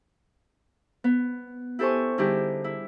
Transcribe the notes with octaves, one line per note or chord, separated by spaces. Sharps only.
B3
E4 G4 A4 C5 G#5 C#6
D3 G3 D#4 E4 G4 G#4
E4